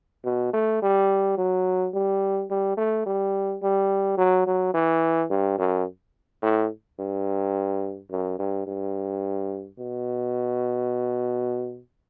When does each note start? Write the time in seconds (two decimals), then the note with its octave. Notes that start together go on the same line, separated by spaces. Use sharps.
0.25 B2
0.53 A3
0.82 G3
1.38 F#3
1.94 G3
2.50 G3
2.77 A3
3.06 G3
3.63 G3
4.18 F#3
4.47 F#3
4.74 E3
5.30 G2
5.58 F#2
6.42 A2
6.99 G2
8.11 F#2
8.39 G2
8.67 G2
9.79 B2